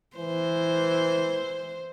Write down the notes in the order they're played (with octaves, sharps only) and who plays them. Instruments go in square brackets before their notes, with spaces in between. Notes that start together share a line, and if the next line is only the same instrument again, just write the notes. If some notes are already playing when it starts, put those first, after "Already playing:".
[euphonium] E3 [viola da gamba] C5